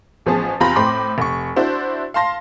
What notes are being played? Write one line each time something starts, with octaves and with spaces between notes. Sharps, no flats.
A1 F3 B3 G#4 A5
E2 C3 F4 A#5 B5 A#6
A2 C4 B5 C6 D6
F1 C#6
D4 E4 F#4 C5
F5 A5 C6 A#6